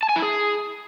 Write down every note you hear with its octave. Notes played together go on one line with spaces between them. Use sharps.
A5
G#5
E4
G#4